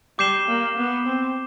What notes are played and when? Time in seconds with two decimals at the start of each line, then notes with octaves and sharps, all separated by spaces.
0.19 G3 D6 G6 C7 E7 G7
0.48 A#3
0.77 B3
1.06 C4